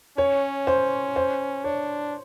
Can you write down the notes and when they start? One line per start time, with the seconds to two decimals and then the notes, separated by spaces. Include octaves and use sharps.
0.17 C#4 C#5
0.67 C5
1.16 C5
1.64 D4 C#5